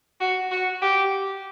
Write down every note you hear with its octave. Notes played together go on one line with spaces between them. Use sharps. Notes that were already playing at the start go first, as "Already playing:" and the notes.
F#4
F#4
G4